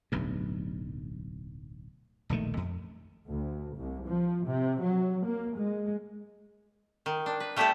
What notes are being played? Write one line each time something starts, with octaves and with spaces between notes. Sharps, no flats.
D1 B1 G2
E1 A#1 D#3 A3
F2
D2
C2
F3
C3
F#3
A#3
G#3
D#3
D4
B4
G3 A3 B3 E4 G4 A4